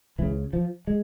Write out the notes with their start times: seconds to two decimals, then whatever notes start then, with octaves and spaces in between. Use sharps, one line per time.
0.19 C#2 C#3 E3
0.53 F3
0.87 G#3